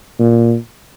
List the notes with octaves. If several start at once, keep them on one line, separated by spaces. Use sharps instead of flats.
A#2